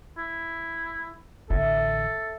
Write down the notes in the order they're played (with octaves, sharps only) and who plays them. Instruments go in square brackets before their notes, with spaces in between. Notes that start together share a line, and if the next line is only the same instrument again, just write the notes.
[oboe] E4
[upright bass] A1 D3 [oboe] A4 [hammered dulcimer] E5